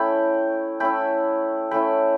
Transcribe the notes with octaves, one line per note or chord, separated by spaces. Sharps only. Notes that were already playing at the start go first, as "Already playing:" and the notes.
Already playing: A3 C#4 E4 G5 B5
A3 C#4 E4 G5 B5
A3 C#4 E4 G5 B5